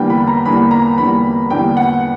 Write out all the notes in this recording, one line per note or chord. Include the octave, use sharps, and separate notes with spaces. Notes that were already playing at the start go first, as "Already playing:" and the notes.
Already playing: E2 D3 G3 A#3 G5
B5
A#5
E2 D3 G3 A#3 B5
A#5
E2 D3 G3 A#3 B5
E2 D3 G3 A#3 G5
F#5